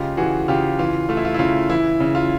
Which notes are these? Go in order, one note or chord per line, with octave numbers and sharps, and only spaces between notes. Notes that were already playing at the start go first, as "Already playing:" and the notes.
Already playing: C#3 G#3 F4 G4
E3 F#4 G#4
C#3 F4 G4
E3 F4
A3 F4
E4
F4
E4
C#3 F4
E3 E4
C#3
F4